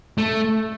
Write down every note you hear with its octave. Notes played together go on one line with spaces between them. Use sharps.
A3